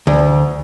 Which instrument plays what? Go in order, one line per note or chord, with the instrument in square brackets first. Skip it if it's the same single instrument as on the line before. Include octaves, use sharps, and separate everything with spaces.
[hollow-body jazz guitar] D2